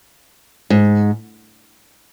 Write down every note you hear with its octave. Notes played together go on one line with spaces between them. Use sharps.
G#2